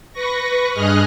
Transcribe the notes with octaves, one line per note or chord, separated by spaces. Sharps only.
B4 C#6 A#6
G2 G#4 D#5 D#6 F6 F#6